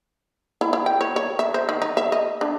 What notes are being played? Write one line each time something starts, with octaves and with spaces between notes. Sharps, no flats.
E4
E4
G5
C#5
C#5
E5
C5
D#3
D#4
E5
D#5
D4